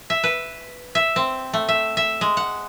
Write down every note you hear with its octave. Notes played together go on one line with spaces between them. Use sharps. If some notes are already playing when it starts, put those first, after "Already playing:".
E5
B4
E5
C4
A3
E5
E5
G#3
F#5